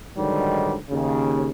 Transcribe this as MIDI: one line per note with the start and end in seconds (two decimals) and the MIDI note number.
0.17 0.74 44
0.17 0.74 50
0.17 0.74 51
0.17 0.74 54
0.17 0.74 55
0.90 1.49 39
0.90 1.49 49